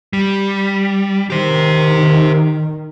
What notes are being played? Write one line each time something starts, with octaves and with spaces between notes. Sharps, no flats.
G3
D#3 G4 C5